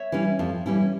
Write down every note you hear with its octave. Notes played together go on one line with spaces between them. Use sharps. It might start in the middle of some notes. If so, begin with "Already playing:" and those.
Already playing: C#5 E5
E3 G3 C#4 E4
F2
E3 G3 C#4 E4